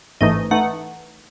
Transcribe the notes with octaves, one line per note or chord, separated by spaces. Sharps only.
A1 G#2 E3 A3 D#4 D#5
E3 A3 D#4 F#5